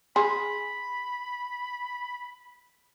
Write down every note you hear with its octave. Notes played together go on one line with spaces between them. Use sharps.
G#4 B5 C6